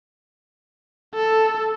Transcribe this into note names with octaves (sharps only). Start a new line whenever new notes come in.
A4